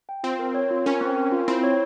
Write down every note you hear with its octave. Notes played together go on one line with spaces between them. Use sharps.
G5
C4 F4
A#4
C#5
F4
C#4 A#4
C4
A#4
F4
C4 E4
C#5